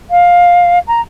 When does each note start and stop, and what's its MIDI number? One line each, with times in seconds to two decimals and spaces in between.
0.10 0.79 77
0.87 1.01 82